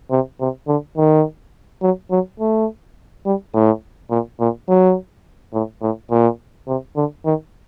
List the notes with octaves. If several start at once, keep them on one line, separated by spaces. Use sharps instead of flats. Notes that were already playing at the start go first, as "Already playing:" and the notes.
C3
C3
D3
D#3
F#3
F#3
A3
G3
A2
A#2
A#2
F#3
A2
A2
A#2
C3
D3
D#3